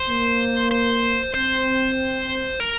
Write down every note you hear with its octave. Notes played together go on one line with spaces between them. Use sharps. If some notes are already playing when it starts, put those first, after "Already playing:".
Already playing: C5
A#3
C5
C4 C5
A#4